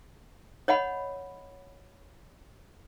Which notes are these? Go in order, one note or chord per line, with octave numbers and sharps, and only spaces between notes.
C#5 D#5 F#5 B5